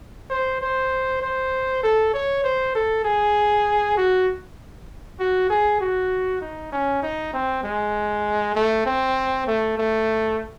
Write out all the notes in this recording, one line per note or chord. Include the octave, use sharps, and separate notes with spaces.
C5
C5
C5
A4
C#5
C5
A4
G#4
F#4
F#4
G#4
F#4
D#4
C#4
D#4
C4
G#3
A3
C4
A3
A3